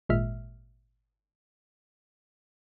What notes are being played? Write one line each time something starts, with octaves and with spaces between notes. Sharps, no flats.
G#1 A#2 G#3 E5 F6